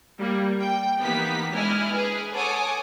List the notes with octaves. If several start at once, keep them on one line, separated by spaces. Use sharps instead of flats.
G3 A#3
G5
E3 A#3 B3 D#4 G4 B6
G#3 D4 E4 D#5 G#5 F6
G#4 B4
A4 C#5 F#5 G#5 D6 D#6